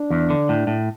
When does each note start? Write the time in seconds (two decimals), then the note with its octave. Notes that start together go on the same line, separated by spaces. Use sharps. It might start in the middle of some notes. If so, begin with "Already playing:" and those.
Already playing: D4
0.10 E2
0.30 D3
0.49 A2
0.67 A2